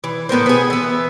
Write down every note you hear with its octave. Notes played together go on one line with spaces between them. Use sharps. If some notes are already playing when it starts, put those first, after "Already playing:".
E3
A2 B3 A#4 C5
B3 G#4
E3 B3